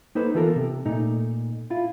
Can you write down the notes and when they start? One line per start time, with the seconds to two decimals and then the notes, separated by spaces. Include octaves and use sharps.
0.15 A#3 D#4 A4 B4 C5
0.35 E3 B3 F4 A4 A#4
0.56 C3
0.86 A#2 A3 D#4
1.70 E4 F4